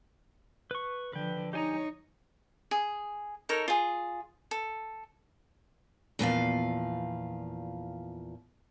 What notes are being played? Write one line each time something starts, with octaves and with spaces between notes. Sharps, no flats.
B4 C#6
D3 F3 B4 G5
D#4 G4 C#5 G#5 A#5
G#4
D#4 A4 A#4 C#5
F4 G#4
A4
E2 A#2 F3 F5